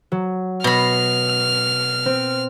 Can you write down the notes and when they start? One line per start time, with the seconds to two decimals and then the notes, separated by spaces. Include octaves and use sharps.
0.12 F#3
0.64 B2 B5 F6 A#6 C7
2.05 C4